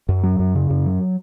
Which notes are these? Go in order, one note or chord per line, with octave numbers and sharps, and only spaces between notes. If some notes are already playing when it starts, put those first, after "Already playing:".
F#2
F#3
F#2
C#3
F#2
F#3